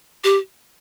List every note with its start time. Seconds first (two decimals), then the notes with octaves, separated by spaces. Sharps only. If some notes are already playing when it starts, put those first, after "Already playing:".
0.24 G4